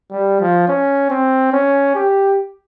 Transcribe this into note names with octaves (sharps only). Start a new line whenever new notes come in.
G3
F3
C#4
C4
C#4
G4